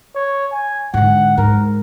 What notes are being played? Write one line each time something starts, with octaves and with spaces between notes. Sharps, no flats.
C#5
G#5
G#2 D3 F#5
G#2 A#4